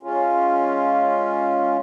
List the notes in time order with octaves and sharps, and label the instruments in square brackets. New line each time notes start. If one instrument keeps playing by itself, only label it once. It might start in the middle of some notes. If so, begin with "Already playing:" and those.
[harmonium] G#3 C#4 F4